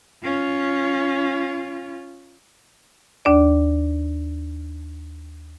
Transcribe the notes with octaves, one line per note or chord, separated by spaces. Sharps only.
C#4 F4
D#2 D4 D5